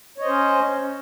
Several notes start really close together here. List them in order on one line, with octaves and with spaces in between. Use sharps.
C#5 D#5 C5 C#4